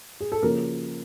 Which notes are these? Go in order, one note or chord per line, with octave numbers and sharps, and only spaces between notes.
G#4
A4
C#3 F3 A#3 A#4